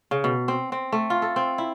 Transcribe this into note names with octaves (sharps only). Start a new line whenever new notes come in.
C#3
B2
C4
C4
A3
F4
A4
C4
E4